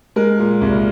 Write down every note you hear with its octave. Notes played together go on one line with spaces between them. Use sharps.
G#3 A#4
A#2
C2